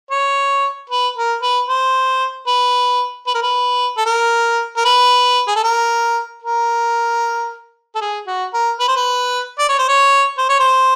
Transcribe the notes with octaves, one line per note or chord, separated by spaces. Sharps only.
C#5
B4
A#4
B4
C5
B4
B4
A#4
B4
A4
A#4
A#4
B4
G#4
A4
A#4
A#4
A4
G#4
F#4
A#4
B4
C5
B4
D5
C#5
C5
C#5
C5
C#5
C5